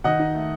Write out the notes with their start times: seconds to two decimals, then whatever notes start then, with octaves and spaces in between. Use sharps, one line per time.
0.04 D#3 D#5 F#5
0.19 D#4
0.35 A3